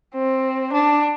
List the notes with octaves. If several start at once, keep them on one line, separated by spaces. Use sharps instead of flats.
C4
D4